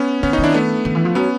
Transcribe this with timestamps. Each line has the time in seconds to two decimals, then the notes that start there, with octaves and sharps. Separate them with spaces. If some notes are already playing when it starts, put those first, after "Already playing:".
Already playing: B3 C#4
0.23 D#3 B3 C#4
0.33 C#4 D#4
0.38 D#3
0.44 D4 E4
0.54 A3 B3
0.85 D#3
0.95 E3
1.05 F3
1.15 F#3 B3 C#4